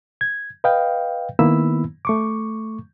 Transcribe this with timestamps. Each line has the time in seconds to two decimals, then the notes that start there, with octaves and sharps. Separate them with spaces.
0.21 G#6
0.64 B4 D#5 F5 G5
1.39 D#3 A#3 B3 E4 B5 E6
2.05 A3 C#6 D6